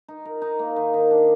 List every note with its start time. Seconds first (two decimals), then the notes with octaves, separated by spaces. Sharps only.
0.08 D#4
0.25 A#4
0.42 D#4
0.59 A#3
0.76 D#3
0.94 D#3
1.11 D4